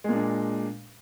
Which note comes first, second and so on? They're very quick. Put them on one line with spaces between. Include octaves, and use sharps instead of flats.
G#3 A#2 D4